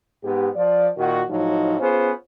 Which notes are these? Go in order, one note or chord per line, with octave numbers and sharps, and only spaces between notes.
G#2 B3 G4
F3 D5
A#2 D#3 F#4
A2 F3 F#3 D#4
B3 C#4 F4 G#4 C5